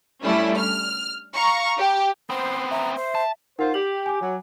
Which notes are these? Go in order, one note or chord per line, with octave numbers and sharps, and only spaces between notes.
G3 A3 C#4 D4 E4
F6
F5 A#5 C#6
G4
B3 C4 C5
E5 A#5
C5
A5
D#4 F4 A#4 C5 F#5
G4 F#7
G#5 D6
F#3